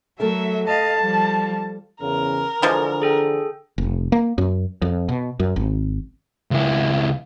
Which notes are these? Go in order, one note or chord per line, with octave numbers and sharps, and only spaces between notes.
F#3 A3 A4 A#4 E5
D#5 F5 A5
F3 G3
E2 C#3 A#4
D3 E3 F3 G#3
G#4 A4 G5
F1
A#3
F#2
F2
B2
F#2
G#1
C#2 E4